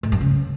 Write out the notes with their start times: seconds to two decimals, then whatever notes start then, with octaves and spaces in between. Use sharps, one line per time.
0.03 A2
0.12 G2
0.21 C#3